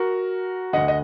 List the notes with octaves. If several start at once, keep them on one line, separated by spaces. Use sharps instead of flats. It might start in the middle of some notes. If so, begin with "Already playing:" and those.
Already playing: F#4 A#4
D2 D3 D#5 F#5
D#5